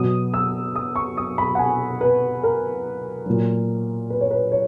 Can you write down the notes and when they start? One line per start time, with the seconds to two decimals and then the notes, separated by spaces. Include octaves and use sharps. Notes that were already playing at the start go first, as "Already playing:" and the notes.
Already playing: B2 F#3 D#6
0.34 E6
0.76 D#6
0.96 C#6
1.17 D#6
1.38 B5
1.55 F#5
1.59 G#5
2.01 B4
2.43 A#4
3.26 A#2 F#3
4.10 B4
4.21 C#5
4.31 B4
4.52 C#5